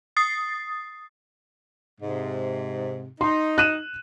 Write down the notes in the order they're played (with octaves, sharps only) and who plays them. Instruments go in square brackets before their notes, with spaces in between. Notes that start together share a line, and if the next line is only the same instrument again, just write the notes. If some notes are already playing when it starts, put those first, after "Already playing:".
[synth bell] D#6 A6 C7
[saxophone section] G#2 C3
[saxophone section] D#4 [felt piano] C6
[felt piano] F#6 D#7 E7